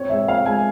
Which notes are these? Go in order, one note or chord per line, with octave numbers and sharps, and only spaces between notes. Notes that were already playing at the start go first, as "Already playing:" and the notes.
Already playing: C4 C#5
G#3 E5
C4 F5
G#3 G#5